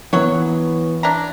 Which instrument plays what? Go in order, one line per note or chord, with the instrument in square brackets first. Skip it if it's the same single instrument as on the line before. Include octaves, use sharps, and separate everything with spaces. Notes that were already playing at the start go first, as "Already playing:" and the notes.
[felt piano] E3 B3 [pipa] F#3 F#4 C#5
[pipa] D4 E4 A#5